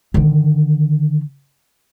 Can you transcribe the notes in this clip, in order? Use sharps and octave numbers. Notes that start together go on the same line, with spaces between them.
D3 D#3